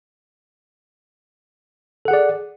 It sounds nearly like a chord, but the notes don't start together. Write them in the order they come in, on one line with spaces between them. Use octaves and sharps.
A4 F#5 G#4 D5